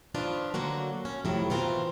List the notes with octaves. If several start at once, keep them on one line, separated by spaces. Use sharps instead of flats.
D#3 F3 D4 F4 B4
D3 F#3 A#3 F#4
C#4
F2 A2 C3 D#3 F#3 E4
B2 E3 C4 F4 A#4